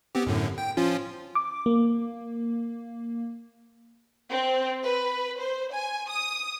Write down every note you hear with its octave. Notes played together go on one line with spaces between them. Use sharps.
B3 C4 G4
F#2 A2 D3
G5
F3 C#4 F4
D6
A#3
C4
B4
C5
G#5
D#6